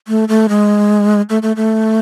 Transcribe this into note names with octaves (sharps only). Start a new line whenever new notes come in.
A3
A3
G#3
A3
A3
A3